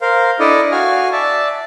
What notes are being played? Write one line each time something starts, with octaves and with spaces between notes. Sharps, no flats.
A#4 C5 F5
D4 E4 A4 D5 D#5
F#4 F5 G#5 F6
D5 E5 A5